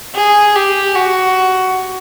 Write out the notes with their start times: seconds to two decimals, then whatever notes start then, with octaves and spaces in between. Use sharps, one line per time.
0.15 G#4
0.55 G4
0.95 F#4